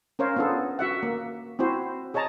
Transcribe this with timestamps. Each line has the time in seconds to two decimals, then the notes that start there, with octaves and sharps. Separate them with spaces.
0.19 C#4 A#4 C5 C#5 F5
0.36 B3 D4 F4 G#4 A4
0.79 F#4 E5 F#5
1.03 A#3
1.59 C4 E4 F#4 C5
2.14 G#4 C#5 D#5 A5 A#5